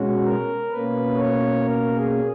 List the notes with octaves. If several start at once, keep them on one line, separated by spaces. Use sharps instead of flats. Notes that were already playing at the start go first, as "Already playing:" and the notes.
Already playing: B2 G#3 C#4 F#4
A#4
B2 A#3 C#4 B4
C#5
A#4
G#4